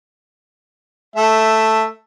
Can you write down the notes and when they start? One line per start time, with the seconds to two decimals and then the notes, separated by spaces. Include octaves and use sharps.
1.16 A3 E5